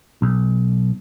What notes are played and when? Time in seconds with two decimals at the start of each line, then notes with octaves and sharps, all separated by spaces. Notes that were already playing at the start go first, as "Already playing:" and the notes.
0.22 B1